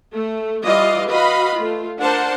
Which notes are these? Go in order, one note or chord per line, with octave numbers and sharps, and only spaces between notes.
A3
E3 G3 F4 D5 D#5 F5
F#4 B4 D#5 F5 B5
A3 F4
D4 A#4 C5 F#5 A5